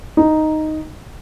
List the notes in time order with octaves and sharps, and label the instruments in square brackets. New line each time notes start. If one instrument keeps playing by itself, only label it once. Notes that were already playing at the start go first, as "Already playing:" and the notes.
[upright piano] D#4